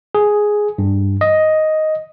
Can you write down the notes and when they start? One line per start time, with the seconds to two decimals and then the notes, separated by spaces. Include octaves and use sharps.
0.15 G#4
0.78 G2
1.21 D#5